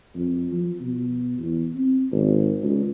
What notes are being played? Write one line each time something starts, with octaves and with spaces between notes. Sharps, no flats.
F2
F3
B2
E2
C4
G#1
C#2